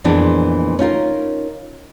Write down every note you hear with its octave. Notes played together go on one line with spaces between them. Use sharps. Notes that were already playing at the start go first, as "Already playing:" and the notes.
F2 A#2 E3 G#3 B3 D4
C#4 D#4 F4 A#4